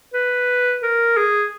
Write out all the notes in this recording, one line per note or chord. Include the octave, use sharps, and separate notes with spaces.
B4
A#4
G#4